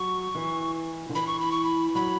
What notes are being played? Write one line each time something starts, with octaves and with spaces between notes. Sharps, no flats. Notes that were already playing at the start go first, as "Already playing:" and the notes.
Already playing: F#3 C#6
E3
D3
E3 B5
C#6
B5
C#6
B5
F#3 B5